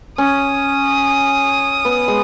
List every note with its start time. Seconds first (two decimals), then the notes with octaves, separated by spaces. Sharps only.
0.18 C#4 D#6
1.85 B3
2.08 G#3